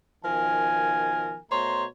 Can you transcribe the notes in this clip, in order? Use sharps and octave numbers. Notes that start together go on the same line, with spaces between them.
B2 D#3 F3 A#4 G#5
B2 A3 C5 C#5 A#5 C6